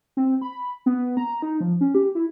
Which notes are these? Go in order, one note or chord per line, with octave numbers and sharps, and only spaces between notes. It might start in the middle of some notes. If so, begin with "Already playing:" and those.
C4
B5
B3
A#5
D#4
F3
C#4
G4
E4